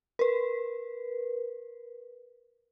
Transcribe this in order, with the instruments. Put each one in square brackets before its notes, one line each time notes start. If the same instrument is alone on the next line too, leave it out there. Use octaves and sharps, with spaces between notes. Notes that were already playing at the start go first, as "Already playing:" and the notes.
[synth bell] A#4 B4